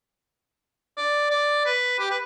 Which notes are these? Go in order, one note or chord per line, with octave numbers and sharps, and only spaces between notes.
D5
D5
B4
G4
B4